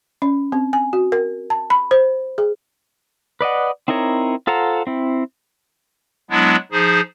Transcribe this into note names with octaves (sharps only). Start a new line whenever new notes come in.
C#4
C4
G#5
F#4
A#4
A5
B5
C5
G#4
B4 D5 D#5 F#5
C4 D#4 E4 A#4 C#5
F4 A4 C5 F#5 A#5
C4 E4
F#3 G#3 B3 D4 E4
F3 D#4 G#4 C5